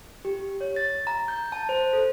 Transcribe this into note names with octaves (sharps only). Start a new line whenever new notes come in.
G4
C#5
A6
A#5
G6
A5
C5
A4